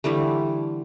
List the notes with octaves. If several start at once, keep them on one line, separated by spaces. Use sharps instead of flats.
D3 E3 G3 A3